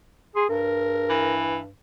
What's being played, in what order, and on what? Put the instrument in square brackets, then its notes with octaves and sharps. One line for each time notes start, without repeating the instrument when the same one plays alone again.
[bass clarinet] G#4 [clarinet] C6
[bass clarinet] G2 [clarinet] A#4
[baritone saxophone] E3